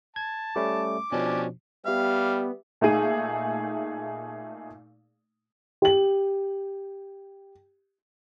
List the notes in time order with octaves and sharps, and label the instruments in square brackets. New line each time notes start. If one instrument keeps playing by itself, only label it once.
[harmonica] A5 [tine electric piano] G#6
[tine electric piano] G3 A3 C#4 [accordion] D6
[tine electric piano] B2 F3 [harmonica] C#4 D4 G4
[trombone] G3 [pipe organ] B3 [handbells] G4 E5 [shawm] F5
[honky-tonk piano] A#2 A3 D#4 G#4 D#7
[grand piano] G4 F#7